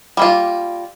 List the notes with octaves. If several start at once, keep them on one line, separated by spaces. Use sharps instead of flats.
G3 A#3 F4